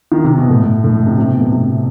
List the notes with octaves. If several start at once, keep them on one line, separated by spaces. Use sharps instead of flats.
D#3
C3
B2
A2
A2
C3
C3
B2
A2
C3